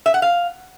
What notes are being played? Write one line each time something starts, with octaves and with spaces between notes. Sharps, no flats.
E5
F#5
F5